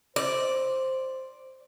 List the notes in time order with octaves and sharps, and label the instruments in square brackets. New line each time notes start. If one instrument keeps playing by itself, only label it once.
[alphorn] C5 [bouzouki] D5